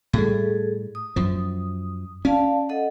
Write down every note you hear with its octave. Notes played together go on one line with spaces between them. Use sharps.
A2 G3 G#4 A4
D#6
F#2 F3
C#4 D5 F5 A5
A4 D#5 F#5